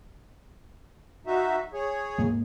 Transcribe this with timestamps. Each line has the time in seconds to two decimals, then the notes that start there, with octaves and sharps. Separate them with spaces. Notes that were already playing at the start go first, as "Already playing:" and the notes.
1.26 D#4 F#4 E5
1.73 G#4 C#5
2.19 G#2 G#3 A#3